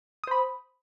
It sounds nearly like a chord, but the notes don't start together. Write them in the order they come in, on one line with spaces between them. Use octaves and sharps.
D#6 C5 B5